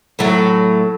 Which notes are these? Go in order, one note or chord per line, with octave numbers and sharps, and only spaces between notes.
A2 F#3 A3